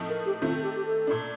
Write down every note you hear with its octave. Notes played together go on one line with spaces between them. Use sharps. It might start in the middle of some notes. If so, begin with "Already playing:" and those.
Already playing: A2 F3 A3 C4 D#4
A#4
G4
D#3 A3 C4 F4
A4
G4
G4
A4
A#2 A3 D4